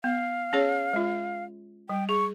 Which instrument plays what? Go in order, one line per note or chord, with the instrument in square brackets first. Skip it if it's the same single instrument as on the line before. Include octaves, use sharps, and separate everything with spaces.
[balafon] B3 [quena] F5
[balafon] C#4 G#4 C#5
G#3 F4
[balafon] G3 [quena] G5
[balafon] G#4 [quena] C#6